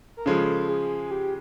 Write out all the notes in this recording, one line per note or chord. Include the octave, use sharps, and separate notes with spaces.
A#4
C#3 F3 G#3 A4
G#4
G4